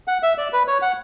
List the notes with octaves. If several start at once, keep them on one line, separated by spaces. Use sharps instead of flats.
F#5
E5
D5
B4
C#5
F#5